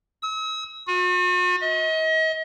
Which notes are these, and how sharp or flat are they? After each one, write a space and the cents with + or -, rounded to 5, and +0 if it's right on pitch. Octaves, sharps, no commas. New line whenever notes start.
E6 -45
F#4 -45
D#5 +40